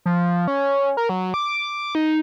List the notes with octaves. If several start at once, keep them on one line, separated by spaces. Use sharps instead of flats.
F3
C#4
A#4
F#3
D6
D#4